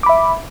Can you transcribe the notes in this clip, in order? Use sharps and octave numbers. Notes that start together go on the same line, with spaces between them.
E5 B5 D6